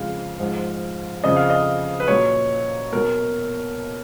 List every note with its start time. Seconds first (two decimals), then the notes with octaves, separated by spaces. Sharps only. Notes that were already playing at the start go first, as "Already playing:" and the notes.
Already playing: F2 C#3 F3 G#3 F5
0.39 G#2 F3 G#3
1.24 F2 C#3 F3 D#5
1.37 F5
1.50 D#5
2.00 B4
2.08 A#2 F#3 C#5
2.92 B2 F#3 A#4